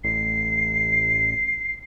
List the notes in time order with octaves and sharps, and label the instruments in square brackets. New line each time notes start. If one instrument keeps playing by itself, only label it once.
[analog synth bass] A1 [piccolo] C7